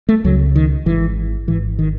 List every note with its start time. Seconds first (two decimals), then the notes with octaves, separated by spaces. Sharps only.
0.09 A3
0.24 C#2 C#3 F#3
0.56 D#3
0.86 G#1 G#2 E3
1.47 G#1 G#2 E3
1.79 D#3